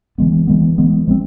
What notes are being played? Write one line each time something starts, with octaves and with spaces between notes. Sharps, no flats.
E3 G#3 B3
E3 G#3 B3
E3 G#3 B3
F3 G#3 C4